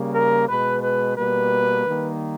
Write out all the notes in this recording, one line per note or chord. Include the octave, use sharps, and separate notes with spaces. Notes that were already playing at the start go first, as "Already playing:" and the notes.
Already playing: C#3 G3 A#3
A#4
B2 G#3 B4
B4
B2 G3 A#3 B4
D#3 G3 A#3